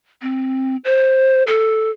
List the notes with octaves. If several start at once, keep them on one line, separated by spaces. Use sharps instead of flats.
C4
C5
A4